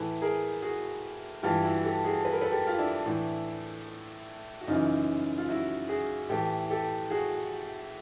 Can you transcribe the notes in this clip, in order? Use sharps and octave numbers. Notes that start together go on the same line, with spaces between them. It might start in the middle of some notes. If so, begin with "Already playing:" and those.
Already playing: A2 E3 A4 B4
G#4 A#4
F#4 G#4
G2 E3 F4 G4
E4 F#4
G4 A4
F#4 G#4
B4
A#4
A4 B4
G4 A4
F4
D4 E4
A2 E3
F#4
F#2 C#3 E3 D#4 F4
F4
E4 F#4
F#4 G#4
A2 E3 G4 A4
G4 A4
F#4 G#4